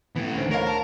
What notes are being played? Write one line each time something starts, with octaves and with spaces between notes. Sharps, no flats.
E3 A3 B3
D2 D#3 C5
A#4 C#5 F5 B5
A5